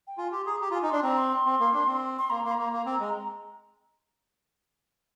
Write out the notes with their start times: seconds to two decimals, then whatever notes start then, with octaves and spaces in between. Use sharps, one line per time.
0.07 G5
0.18 F4 G#5
0.32 G4 C6
0.46 G#4 A#5
0.60 G4 A#5
0.71 F4
0.75 G#5
0.82 D#4
0.89 D4 C6
1.03 C4 A#5
1.17 C6
1.32 C6
1.46 C4
1.60 A#3
1.74 D4
1.87 C4
2.18 C6
2.30 A#3 A#5
2.44 A#3 C6
2.51 A#5
2.58 A#3
2.72 A#3
2.86 C4
3.00 G#3